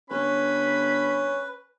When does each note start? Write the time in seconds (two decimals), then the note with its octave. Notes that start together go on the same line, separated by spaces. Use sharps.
0.10 G1 C#4 B4 B5